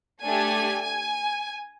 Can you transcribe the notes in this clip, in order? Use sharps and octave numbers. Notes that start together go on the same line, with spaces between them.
A3 D4 G4 G#5
G#5